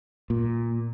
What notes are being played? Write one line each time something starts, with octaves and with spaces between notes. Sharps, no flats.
A#2